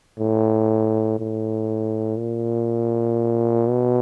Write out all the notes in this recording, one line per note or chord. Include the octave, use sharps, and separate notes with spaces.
A2
A2
A#2
B2